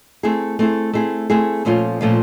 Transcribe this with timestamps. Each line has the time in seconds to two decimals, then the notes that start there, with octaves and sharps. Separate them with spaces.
0.23 A3 C4 E4 G#4
0.59 A3 C4 E4 G#4
0.93 A3 C4 E4 G#4
1.30 A3 C4 E4 G#4
1.65 A#2 F3 A3 C#4 F4
2.01 A#2 F3 A3 C#4 F4